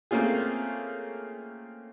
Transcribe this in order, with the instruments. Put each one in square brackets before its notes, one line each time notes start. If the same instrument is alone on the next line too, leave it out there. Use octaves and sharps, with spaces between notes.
[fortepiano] A3 A#3 C4 C#4 F4 G#4